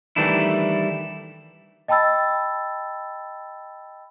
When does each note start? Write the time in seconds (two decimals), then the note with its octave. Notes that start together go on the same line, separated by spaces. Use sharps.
0.16 D#3 E3 G3 A3 D4 E4
1.88 D#5 G5 A5 B5 E6 A6